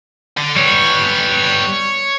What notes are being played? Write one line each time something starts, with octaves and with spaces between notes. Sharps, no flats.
D3
G3 B3 C#5